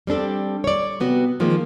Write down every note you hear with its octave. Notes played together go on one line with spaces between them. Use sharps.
G3 C4 D4 A4
C#5 D5
C3 B3 F#4
D#3 F3 G#3 A#3